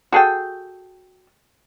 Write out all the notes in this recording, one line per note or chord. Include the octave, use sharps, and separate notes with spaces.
F#4 G#4 A4 G5